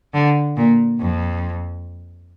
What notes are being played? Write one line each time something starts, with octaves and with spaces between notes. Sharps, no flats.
D3
A#2
F2